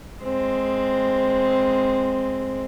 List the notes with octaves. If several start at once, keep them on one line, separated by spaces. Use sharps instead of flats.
G#3 C4